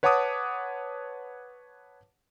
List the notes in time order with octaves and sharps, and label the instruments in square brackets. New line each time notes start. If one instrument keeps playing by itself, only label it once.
[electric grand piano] B4 C#5 F#5 A5 D6 D#6